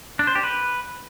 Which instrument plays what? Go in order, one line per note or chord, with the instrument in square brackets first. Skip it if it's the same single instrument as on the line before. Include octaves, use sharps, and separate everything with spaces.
[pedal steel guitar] D4
C5
G4
B4